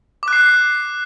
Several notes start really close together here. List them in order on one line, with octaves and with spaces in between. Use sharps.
D6 F#6 C7